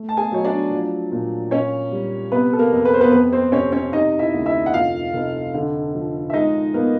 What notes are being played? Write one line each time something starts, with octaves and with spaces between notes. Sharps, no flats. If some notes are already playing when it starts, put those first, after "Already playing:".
Already playing: A3
A5
G#4 G#5
F#3 C#5
D4 D5
F3
A#2
A#2 C#4 C#5
G3
C3 B3 B4
A4
A#3 A#4
F2
B4
C5
B3 B4
F2 B3 B4
C4 C5
C3 C#4 C#5
C#4 C#5
C3 D#4 D#5
E4 E5
D2
E4 E5
F#5
F1 F4 F5
F1
D3
F3
E5
G#3 D#4 D#5
A#3 B3 A#4